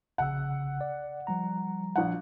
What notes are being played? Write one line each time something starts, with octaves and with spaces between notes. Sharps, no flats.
A#1 C#3 F#5 E6
D5
F3 G3 A#5
A#1 F#5